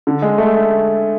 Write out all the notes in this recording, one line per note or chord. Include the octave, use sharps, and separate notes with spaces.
D3
G#3
A3